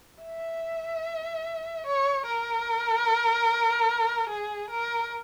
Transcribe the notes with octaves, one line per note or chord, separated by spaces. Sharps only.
E5
C#5
A#4
G#4
A#4